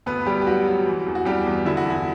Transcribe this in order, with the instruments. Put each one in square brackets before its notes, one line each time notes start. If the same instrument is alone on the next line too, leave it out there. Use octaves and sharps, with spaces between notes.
[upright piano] D2 B3 B4
D2 G3 G4
G4
F#3 F#4
F#3
E3
E2
F#4
E2 G3 G4
E2
D3 E4
F#4
E2 E4